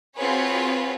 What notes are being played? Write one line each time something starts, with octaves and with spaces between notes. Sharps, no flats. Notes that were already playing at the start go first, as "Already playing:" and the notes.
C4 F4 F#4 G#4 B4 C#5